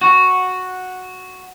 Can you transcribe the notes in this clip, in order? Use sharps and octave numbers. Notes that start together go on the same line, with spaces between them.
F#4